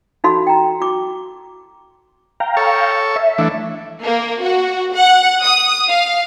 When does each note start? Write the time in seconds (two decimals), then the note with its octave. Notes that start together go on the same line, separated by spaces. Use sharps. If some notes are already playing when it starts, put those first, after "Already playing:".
0.24 D#4 F#4 A4 F5 B5 C6
0.47 G5 A#5
0.80 F#4 D6
2.40 F5 G5 A#5
2.57 A4 C#5
3.16 E5
3.38 E3 A3 D4
4.04 A#3
4.43 F#4
4.95 F#5
5.43 D#6
5.89 F5